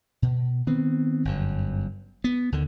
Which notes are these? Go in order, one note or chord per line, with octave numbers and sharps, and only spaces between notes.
B2
D#3 B3 C4
G1 F#2
B3
D2 D3 D#3